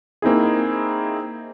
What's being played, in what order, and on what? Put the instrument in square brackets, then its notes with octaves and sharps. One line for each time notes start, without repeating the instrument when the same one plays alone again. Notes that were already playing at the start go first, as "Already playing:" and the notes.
[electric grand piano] A#3 C4 D#4 E4 G#4